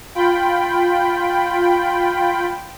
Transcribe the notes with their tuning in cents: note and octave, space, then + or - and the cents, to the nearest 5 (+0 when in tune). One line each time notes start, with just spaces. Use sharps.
F4 +10 G5 +0 B5 +10